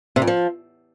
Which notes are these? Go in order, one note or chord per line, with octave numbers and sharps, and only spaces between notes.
C3
F2
F3